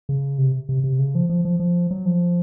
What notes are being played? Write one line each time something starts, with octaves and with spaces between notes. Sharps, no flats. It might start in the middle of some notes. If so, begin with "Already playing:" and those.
C#3
C3
C3
C3
C#3
F3
F3
F3
F3
F#3
F3